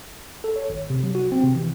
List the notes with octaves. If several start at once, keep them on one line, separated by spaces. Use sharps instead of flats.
A4
C#5
G#1
C3
F#3
F#4
C4
C3
E3